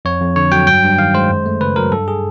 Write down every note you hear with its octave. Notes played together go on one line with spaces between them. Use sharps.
F2 C#5
F2
D3 C#5
F#3 G5
G2 G5
G2
D#3 F5
G#3 C5
F#2
A3
C#3 B4
F#3 A#4
G2 A4
G#4